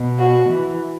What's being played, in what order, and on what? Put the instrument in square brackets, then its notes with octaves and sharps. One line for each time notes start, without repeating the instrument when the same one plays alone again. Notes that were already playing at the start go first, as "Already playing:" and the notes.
Already playing: [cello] B2
[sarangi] F#4
[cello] E3